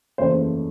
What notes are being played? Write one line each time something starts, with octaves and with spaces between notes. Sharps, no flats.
F#1 E2 C#3 F3 A3 C5